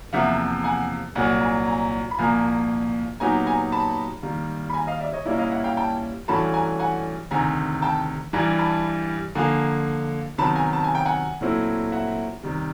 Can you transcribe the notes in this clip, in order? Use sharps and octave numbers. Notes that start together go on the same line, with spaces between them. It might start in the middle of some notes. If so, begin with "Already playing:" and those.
E2 C3 F3 A#3 E5 F#5
F#5 G#5
C2 A#2 F#3 F#5 G#5
G#5 A#5
G#5 A#5
B5
C2 A#2 F3 A#3 G#5 A#5
A#2 F#3 B3 D#4 G4 G#5 A#5
G#5 A#5
A5 B5
D#3 G3 A#3
B5
G#5 A#5
D#5 F5
D5 E5
C#5 D#5
A#2 G3 A#3 C#4 E4 D5 E5
D#5 F5
E5 F#5
F5 G5
G5 A5
G2 E3 A3 C#4 F#4 A5 B5
G#5 A#5
F#5 G#5
D2 C3 D#3 G#5 A#5
G5 A5
G2 E3 G3 G#5 A#5
A5 B5
D3 F3 A#3 G#5 A#5
C3 D#3 F#3 B3 A5 B5
G#5 A#5
A5
G#5
G5
F#5 G#5
A#2 F#3 A3 C4 E4
E5 F#5
C3 D#3 G3